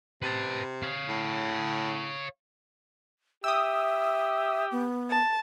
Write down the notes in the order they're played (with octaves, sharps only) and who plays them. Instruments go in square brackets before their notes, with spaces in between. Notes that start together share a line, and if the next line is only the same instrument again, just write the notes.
[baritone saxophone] C3 [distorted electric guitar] B4 A5
[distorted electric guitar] C#5 F5
[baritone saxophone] A2
[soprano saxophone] G4 [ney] E5 [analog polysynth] D#6 E6
[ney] B3
[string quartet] A5